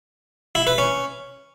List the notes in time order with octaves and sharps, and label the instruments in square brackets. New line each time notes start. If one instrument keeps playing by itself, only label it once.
[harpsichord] E4
B4
C#4